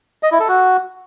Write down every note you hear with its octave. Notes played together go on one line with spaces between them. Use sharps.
D#5
E4
A4
F#4